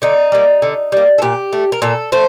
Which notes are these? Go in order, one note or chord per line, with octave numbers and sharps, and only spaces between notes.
D3 D#4
G3 A#3
D3
G3 A#3
A4
A#2 G4
A3
A#4
A#2 A4
A3 C5